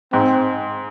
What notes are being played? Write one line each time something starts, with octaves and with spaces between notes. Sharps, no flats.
G#2 C4